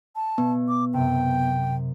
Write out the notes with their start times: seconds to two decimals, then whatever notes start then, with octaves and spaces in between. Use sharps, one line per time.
0.16 A5
0.38 B2 B3
0.68 D6
0.94 F#2 C3 G5